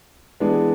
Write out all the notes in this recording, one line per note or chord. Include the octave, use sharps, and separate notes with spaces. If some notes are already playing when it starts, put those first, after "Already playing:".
E3 G#3 B3 D4